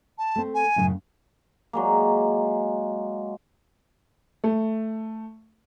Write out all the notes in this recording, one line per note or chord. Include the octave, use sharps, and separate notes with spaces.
A5
A3 C4
G#5
F#2 A2 C#3
F#3 G#3 A#3
A3